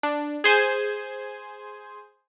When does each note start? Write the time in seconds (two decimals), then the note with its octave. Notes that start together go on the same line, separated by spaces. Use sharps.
0.03 D4
0.44 G#4 C5 G#5